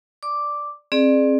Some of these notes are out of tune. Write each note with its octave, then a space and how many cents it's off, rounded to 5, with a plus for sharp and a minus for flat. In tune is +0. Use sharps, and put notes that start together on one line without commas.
D5 +5 D6 +0
C4 +30 G#4 +15 D5 +20